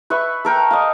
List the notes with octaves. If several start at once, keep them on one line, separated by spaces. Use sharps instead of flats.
B4 E5 C#6
A4 A#4 G5
D#5 F5